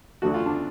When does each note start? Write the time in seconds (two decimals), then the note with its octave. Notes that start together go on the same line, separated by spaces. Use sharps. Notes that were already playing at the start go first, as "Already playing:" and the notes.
0.22 D2 D3 F#3 A3 F#4
0.34 F4
0.46 D4